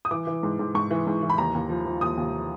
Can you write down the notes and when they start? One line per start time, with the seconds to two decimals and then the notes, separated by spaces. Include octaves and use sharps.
0.05 D#6
0.11 E3 D6
0.27 E3
0.43 G#2
0.59 G#2
0.75 G#2 C#6
0.91 E3
1.07 G#2
1.22 E3
1.30 B5
1.38 D#2 A#5
1.54 D#2
1.70 F3
1.86 F3
2.01 D#2 D#6
2.17 D#2